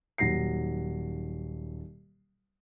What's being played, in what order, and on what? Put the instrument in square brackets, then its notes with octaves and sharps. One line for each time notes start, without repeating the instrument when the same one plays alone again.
[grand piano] D#1 F#3 A#6 C7